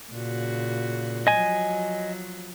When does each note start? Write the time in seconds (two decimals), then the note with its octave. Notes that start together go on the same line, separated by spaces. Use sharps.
0.12 A#2 C#3 F#4
1.27 F3 F#3 D#5 G#5